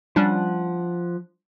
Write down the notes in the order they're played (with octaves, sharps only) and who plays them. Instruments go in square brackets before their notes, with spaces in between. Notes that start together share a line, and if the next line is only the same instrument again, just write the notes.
[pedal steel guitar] F3 F#5 [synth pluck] G3 C#4 D4